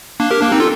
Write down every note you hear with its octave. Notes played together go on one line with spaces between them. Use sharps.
A#3 D4
G4 A#4
A#3 D4
C4 D#4
F4 A4